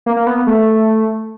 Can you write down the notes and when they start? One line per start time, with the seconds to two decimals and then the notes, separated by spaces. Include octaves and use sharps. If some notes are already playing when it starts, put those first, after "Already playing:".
0.06 A#3
0.17 A#3
0.27 B3
0.47 A3